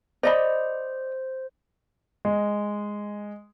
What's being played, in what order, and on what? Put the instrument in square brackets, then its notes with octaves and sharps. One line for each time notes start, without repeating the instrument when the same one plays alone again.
[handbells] C5 [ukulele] D5 D#5 B5
[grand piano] G#3